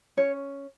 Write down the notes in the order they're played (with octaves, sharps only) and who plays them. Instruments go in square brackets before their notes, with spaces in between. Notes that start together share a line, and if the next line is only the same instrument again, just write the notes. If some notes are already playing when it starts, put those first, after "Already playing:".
[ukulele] C#4 C#5